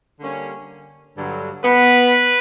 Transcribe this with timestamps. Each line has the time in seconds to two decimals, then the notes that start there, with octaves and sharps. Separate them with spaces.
0.20 D3 G3 A#3 C#4
1.17 G2 D3 F#3
1.65 B3 B4